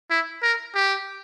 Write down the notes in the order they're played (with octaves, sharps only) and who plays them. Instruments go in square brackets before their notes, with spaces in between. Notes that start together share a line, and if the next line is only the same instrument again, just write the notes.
[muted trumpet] E4
A#4
G4